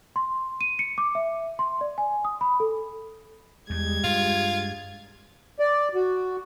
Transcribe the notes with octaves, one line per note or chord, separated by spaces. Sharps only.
C6
D#7
C#7
D6
E5
C6
D5
G#5
D#6
B5
A4
E2 G3 G#3 G#6
G2 F4
D5
F#4